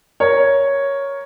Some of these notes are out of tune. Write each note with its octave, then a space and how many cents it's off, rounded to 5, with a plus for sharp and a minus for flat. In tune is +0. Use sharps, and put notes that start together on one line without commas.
A#4 +5 C#5 +0